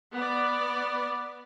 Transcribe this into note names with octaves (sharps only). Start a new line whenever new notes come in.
B3 D5